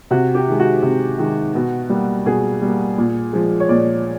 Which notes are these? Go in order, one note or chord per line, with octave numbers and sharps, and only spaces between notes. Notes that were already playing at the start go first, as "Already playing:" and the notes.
C3 F#4
G4
D#3 G#3
F#4
C3
D#3 G#3
B2
G3 A#3
B2 G#4
G3 A#3
A#2
F3 G#3
C#5
A#2 D5